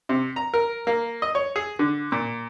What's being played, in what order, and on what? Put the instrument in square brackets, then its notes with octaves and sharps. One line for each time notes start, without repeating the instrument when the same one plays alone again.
[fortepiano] C3
A#5
A#4
A#3
D#5
C#5
G#4
D3
A#2